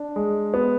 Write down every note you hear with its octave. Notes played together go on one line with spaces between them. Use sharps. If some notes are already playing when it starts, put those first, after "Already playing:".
Already playing: D4
G#3
B3